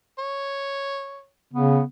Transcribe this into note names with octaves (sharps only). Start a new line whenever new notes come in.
C#5
C#3 B3